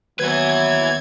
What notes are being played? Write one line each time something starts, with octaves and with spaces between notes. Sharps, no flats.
D#2 F#3 B3 B4 E5 G#6